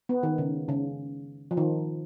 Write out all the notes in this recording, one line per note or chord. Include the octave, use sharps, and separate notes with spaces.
B3
D#3
C#3
C#3
F3
D#3